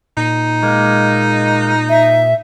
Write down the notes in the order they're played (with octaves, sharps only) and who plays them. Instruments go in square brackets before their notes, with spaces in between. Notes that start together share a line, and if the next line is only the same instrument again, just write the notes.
[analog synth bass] A#2 [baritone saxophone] D#4
[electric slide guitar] G#3 A#3
[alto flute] E5